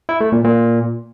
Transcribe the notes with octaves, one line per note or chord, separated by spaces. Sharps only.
E4
A3
A#2
A#2